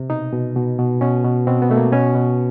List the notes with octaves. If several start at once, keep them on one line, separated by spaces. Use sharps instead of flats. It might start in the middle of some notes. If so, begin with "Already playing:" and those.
Already playing: C3
B2 D#4
B2
B2
B2
B2 C#4
B2
B2 C4
B3
B2 A3
A#3
B2 C#4
B2